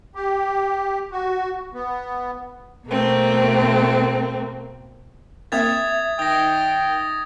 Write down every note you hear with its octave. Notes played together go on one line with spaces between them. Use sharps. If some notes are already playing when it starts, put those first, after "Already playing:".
G4
F#4
B3
B2 A3 A#3 C4
A#3 C4 A#4 E5 D#6 G#6 A6
D#3 G5 D#6 A#6